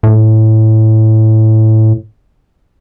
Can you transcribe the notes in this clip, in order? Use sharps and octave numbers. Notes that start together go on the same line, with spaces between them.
A2